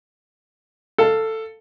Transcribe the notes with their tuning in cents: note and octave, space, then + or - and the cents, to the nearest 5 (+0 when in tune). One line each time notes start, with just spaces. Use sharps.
A4 +10 F5 +0